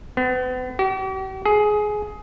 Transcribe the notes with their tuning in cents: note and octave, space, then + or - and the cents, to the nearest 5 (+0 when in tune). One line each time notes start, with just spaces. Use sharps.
B3 +40
G4 -45
G#4 +15